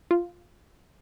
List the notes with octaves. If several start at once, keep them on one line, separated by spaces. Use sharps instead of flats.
F4